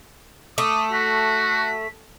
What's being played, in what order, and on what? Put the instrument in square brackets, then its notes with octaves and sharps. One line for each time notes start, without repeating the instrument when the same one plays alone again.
[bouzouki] A3 [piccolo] D6 [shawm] D#6
[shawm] F#4 [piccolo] B6